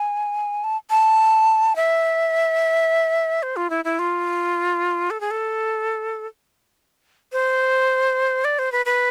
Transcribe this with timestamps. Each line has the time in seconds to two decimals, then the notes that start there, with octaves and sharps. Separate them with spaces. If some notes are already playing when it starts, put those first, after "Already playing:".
Already playing: G#5
0.64 A5
0.90 A5
1.76 E5
3.43 C5
3.56 F4
3.70 E4
3.85 E4
3.99 F4
5.10 A4
5.20 G#4
5.31 A4
7.32 C5
8.44 D5
8.59 C5
8.72 B4
8.86 B4